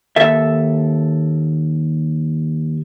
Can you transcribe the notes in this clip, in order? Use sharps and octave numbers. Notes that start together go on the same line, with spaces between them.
D#2 A4 E5